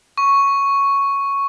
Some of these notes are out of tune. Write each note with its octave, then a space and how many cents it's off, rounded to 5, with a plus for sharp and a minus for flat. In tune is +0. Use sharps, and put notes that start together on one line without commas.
C#6 +0